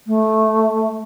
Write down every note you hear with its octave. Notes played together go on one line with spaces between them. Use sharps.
A3